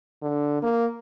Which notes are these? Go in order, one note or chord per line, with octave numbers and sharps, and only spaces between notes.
D3
A#3